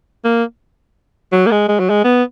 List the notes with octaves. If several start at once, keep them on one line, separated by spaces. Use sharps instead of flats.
A#3
F#3
A#3
G#3
G#3
F#3
G#3
B3